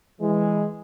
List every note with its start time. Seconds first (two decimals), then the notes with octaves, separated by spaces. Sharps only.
0.20 E3 G#3